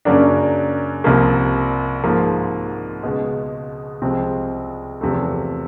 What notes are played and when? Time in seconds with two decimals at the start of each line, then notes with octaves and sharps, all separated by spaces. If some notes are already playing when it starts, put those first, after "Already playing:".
0.05 F#2 C#3 F#3 A#3 D4
1.04 C2 C3 F3 A#3
2.04 G#2 F3 A#3
3.03 C#2 B2 G#3
4.02 C2 C3 F3 G#3 C4
5.01 E2 C3 F3 A3